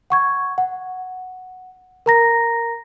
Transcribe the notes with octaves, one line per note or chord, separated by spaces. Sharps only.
F#5 C#6 G#6
F#5
A#4 A#5 A#6